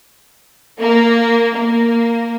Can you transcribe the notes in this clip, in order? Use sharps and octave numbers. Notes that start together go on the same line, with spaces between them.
A#3
A#3